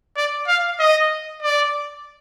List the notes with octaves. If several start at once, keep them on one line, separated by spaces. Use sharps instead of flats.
D5
F5
D#5
D5